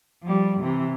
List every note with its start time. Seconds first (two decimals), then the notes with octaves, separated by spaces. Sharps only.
0.23 F3 G3
0.60 C3 E3